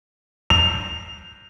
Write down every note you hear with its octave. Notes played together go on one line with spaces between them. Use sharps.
F7